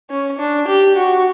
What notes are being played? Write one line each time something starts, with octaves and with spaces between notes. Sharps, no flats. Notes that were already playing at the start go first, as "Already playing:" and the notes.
C#4
D4
G4
F#4